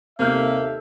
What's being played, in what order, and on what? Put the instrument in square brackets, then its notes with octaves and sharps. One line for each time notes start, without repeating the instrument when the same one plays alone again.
[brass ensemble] D#2 A4 E5 [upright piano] C3 F6 G6 [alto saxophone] A#3